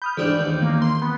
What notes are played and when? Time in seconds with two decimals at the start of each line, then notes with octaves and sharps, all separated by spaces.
0.02 B5 D#6 F6 G6
0.17 G#2 E3 G3 D4
0.38 D#2
0.62 A#3
0.82 C6
1.02 B3